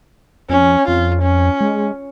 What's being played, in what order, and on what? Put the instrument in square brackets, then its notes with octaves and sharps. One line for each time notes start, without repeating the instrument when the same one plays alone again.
[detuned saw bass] F2 [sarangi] C#4
[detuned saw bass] F2 [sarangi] F4
[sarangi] C#4
[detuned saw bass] G#3